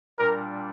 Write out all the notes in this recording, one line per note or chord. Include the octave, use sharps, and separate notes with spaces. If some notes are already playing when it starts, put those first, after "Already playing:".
A#2 G3 D4 A#4